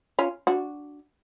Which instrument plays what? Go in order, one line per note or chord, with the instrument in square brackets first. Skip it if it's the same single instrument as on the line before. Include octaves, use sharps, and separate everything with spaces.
[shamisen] C#4 F4
D4 F#4